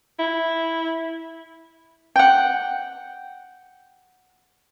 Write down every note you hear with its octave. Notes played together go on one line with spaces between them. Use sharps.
E4
F#5 G5